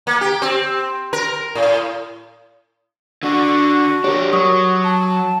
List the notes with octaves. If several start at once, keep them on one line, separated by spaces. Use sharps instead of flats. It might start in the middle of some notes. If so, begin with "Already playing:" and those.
A#3
G4
C4
A#4
A2
D3 D4 F#4
D4 G4 A#4 C#5
F#3 C#6 D#6
A5